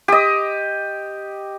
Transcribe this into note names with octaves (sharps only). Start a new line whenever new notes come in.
G4 D#5